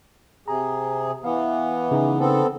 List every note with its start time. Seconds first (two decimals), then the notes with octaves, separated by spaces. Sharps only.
0.48 C3 G#4 A#5
1.24 E3 B3 F5
1.91 C#3 D#4
2.20 B3 C4 A4